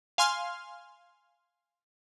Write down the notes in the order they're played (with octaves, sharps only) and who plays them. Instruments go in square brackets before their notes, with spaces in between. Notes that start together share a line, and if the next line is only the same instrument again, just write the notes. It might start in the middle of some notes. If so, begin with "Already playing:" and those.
[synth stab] F5 G#5 C6 F6